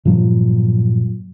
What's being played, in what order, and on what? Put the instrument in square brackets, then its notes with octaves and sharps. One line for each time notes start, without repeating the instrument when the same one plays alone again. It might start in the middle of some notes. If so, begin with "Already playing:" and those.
[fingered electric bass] G2 A#2 F3 F#3